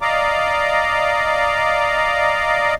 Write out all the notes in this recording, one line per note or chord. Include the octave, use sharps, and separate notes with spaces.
D5 D#5 F5 A#5 D6